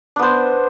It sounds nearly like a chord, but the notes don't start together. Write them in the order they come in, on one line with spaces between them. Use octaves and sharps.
D4 B3 C5